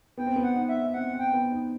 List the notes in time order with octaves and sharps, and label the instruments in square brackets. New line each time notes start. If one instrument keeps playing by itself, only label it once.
[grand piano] B3 [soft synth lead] G5
[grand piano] C4
B3
[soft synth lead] F#5
[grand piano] D#4
[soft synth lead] E5
[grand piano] C4 [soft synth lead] F#5
[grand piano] C4
[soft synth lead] G5
[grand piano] B3
D#4